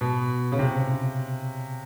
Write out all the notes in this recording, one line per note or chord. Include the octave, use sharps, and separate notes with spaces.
B2
C#3
C3